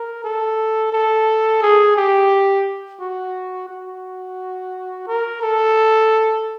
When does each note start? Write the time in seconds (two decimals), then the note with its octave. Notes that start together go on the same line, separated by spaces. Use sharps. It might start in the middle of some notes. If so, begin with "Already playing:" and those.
Already playing: A#4
0.24 A4
0.93 A4
1.62 G#4
1.97 G4
3.00 F#4
3.69 F#4
5.07 A#4
5.42 A4